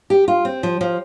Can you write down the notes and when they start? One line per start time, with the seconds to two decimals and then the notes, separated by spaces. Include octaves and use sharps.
0.10 G4
0.28 F4
0.45 C4
0.63 F3
0.81 F3